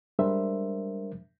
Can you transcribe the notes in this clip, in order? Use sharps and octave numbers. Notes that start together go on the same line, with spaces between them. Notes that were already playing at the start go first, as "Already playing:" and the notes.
G3 G#3 D4 A#4 C5 E5